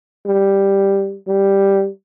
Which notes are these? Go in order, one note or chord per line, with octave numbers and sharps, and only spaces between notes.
G3
G3